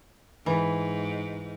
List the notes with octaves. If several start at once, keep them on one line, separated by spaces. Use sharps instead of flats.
G#2 E3